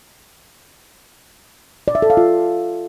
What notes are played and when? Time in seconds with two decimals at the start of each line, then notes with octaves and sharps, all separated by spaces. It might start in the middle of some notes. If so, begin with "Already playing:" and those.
1.88 D5
1.95 E5
2.02 A4
2.10 F5
2.17 F4